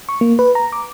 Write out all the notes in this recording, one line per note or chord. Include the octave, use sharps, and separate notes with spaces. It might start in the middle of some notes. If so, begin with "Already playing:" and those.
C#6
A#3
B4
A#5
D6